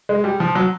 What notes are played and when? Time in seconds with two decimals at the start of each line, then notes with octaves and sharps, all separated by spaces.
0.09 G#3
0.24 G3
0.40 F3
0.55 F#3